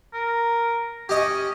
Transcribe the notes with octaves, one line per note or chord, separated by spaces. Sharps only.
A#4
C#4 G4 D#5